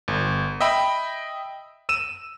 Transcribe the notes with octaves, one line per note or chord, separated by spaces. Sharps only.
G1
D#5 E5 G5 B5
E6 D#7 E7